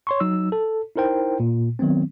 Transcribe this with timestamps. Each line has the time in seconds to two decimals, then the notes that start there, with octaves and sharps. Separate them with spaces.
0.07 C#5 C6 C#6
0.20 F#3 D#4 E6
0.52 A4
0.96 D#4 E4 A#4 C5 G5
1.40 A#2
1.79 D#3 F#3 B3 C4